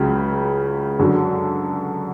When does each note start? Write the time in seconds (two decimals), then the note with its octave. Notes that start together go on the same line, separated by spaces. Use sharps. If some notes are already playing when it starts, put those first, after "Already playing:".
Already playing: C#2 C#3 F#3
0.99 F#2 D3 F#3